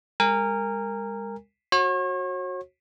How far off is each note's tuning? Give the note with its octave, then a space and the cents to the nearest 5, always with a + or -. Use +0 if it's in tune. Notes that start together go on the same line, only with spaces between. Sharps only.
G#3 -40 A#4 -15 G#5 -35
F#4 -10 C#5 -40